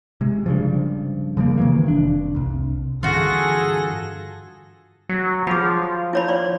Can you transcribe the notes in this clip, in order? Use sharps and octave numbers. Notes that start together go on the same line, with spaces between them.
C3 G#3
G2 C#3 F3
C#3 F3 G3 A#3
C3 D#3 E3 A#3
F1 D4
C2
G2 D3 E3 F4 F#4 G#4 A4 A#6
F#3
F3 G#4 B5
E4 C#5 B5
D5 C6